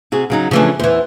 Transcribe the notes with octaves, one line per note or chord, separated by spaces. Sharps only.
C3 F#4 G#4
C#3 F#3 D#4
C#3 E3 F3 A3 C#4 D4
E2 E3 C5